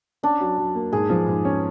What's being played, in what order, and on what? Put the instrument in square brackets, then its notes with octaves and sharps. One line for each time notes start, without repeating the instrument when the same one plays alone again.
[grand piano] C#4 [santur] D4
[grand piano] F#3
F#3
A#3
[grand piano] G#2 [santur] G#4
[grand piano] F3
G#2
C#4